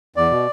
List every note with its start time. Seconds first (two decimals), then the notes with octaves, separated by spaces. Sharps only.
0.16 E2 D5
0.31 B2